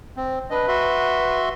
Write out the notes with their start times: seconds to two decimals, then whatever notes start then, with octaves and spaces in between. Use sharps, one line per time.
0.16 C4
0.50 D4 B4 D#5
0.68 F#4 E5 C6